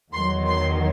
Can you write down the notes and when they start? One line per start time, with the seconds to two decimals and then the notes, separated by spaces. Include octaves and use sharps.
0.12 E2 D#3 F#3 C6
0.48 C6